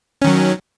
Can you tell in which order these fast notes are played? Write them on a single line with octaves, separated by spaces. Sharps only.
C#4 D#3 F#3